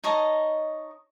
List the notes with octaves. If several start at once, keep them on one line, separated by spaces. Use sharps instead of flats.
D#4 C#5 D#5 A5